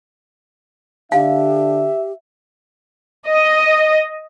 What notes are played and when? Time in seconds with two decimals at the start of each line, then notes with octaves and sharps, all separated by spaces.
1.12 D3 D4 G4 E5 F5
3.28 D#5